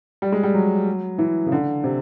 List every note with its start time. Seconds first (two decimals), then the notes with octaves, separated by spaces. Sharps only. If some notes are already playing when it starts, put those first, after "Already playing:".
0.22 G3
0.32 G#3
0.43 G3
0.54 F#3
1.18 E3
1.46 C#3
1.52 D3
1.84 C3